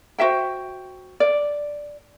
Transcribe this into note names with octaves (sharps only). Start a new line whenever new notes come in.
F#4 C5 E5 G5
D5